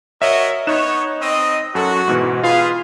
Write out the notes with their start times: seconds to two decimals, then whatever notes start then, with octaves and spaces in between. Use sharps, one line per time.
0.22 F#4 A#4 C#5 D#5 E5
0.67 B3 D#4 C#5 F#6 E7
1.22 C4 D#5
1.75 F#2 F#4 A4
2.08 G#2 B2 E3
2.43 F4 G#4 B4 F5 C6